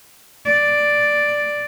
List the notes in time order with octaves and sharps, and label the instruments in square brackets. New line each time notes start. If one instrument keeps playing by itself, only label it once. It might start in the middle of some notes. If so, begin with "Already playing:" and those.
[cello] D5